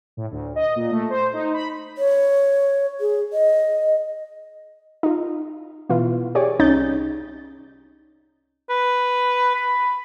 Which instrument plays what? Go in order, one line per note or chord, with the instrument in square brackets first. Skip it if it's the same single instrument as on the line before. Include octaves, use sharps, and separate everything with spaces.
[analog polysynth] A2
D2
D#5
A#2
A3
C5
D#4
B5
[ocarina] C#5
G#4
D#5
[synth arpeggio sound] D#4 F4
B2 E3 F4
G4 G#4 C#5 D5
C2 C#4 D#4 G6 A6
[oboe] B4
B5